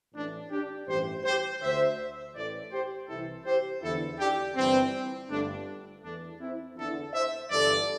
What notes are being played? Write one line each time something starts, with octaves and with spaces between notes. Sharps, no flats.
A1 A2 E3 A3 D4
D4 G4
A1 G2 E3 G4 C5
G4 C5
D2 D3 C5 E5
A1 A2 E3 A4 D5
G4 C5
C2 C3 E3 E4 A4
G4 C5
E2 D3 E4 A4
D4 G4
G1 G2 E3 G3 C4
G1 G2 D3 A3 D4
E2 E3 A3 D4
C4 E4
E2 D3 E4 A4
C5 E5
G1 G2 E3 A4 D5